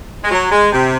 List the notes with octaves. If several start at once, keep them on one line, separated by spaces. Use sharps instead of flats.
G#3
F#3
G#3
C3